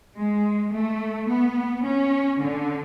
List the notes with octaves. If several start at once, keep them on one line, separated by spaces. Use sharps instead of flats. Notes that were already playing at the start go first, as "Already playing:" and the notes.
G#3
A3
B3
C#4
D3